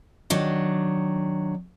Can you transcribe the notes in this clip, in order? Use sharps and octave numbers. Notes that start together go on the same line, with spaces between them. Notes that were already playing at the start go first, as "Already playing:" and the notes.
D#3 F#3 D4